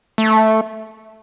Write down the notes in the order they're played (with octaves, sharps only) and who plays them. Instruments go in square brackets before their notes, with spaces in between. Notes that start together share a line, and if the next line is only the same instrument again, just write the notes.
[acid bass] A3